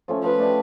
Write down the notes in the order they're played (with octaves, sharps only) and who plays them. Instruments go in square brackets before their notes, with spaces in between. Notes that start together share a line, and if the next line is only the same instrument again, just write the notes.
[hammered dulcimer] F3 A3 C#4
[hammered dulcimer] F3 [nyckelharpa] B4
[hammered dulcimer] A3 D4 G4